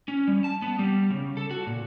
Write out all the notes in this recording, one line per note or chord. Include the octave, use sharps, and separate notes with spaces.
C#4
G3
A5
B3
G3
C#3
A4
F#4
A#2